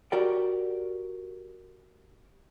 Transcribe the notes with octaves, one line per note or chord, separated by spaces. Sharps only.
F#4 G4 A#4 D5 G5